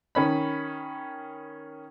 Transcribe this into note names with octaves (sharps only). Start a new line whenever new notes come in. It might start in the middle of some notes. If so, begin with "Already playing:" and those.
D#3 C#4 B5